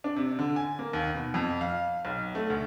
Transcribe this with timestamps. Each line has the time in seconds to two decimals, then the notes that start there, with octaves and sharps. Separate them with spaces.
0.04 D4
0.16 C3
0.39 D3
0.56 G#5
0.79 A#3
0.93 D#2
1.15 B2
1.34 F2
1.61 F5
2.05 B1
2.35 A3
2.50 D2